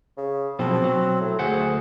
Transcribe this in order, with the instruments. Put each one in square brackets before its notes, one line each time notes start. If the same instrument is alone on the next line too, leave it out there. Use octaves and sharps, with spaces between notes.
[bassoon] C#3
[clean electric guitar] B1 B2 F3 [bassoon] C4
[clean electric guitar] F#3
[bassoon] A2
[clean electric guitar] D2 C5 F#5 [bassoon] G#4